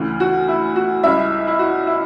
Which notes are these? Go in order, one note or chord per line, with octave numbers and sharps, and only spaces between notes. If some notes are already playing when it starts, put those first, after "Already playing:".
Already playing: D2 C#3 E3
F#4
E4
F#4
C#2 C#3 G3 E4 E5
E4
F#4
E4